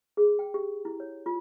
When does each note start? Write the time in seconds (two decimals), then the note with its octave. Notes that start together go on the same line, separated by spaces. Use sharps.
0.17 G#4
0.39 G5
0.54 G4
0.85 E4
1.00 C#5
1.26 F4